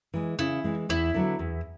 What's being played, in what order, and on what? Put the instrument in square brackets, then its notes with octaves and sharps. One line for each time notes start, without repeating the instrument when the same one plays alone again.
[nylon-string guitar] E3 G#3
[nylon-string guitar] C#3 [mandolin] E4
[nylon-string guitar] E3 G#3
[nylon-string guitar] E2 [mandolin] E4
[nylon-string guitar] D3 F#3 B3
E2